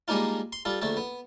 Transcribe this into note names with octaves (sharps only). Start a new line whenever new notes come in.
G3 G#3 A#3 D4 D#4 F4
C6
G3 F4 A4
A#1 D3 A3 A4
B3